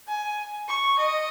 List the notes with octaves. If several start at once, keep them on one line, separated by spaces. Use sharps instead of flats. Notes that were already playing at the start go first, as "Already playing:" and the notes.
G#5
C#6
D#5